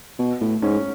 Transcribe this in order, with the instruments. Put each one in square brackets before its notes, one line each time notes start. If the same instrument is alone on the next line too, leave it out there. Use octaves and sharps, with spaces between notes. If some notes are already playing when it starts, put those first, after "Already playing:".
[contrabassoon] B2
A2
[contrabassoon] G#2 [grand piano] C#4